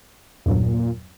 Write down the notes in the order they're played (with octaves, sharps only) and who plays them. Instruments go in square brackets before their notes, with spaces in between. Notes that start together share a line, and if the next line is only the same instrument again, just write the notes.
[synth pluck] E2 G2 F#3 [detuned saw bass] A#2